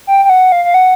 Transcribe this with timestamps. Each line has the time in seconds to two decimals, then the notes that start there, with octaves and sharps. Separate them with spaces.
0.07 G5
0.25 G5
0.29 F#5
0.52 F5
0.65 F5
0.74 F#5